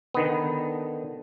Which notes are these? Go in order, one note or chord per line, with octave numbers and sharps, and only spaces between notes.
D3 D#3 B3